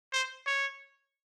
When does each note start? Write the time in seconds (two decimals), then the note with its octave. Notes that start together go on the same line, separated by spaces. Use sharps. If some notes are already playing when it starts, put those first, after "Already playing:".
0.13 C5
0.47 C#5